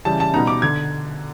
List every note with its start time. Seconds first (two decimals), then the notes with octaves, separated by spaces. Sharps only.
0.05 C#3 E3 G3 A5
0.20 A5
0.34 B2 G3 B3 D#4 A#5
0.47 D6
0.62 D3 G#6